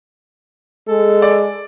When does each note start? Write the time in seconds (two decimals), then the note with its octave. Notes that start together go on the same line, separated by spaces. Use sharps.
0.88 G#3 A4
1.22 D5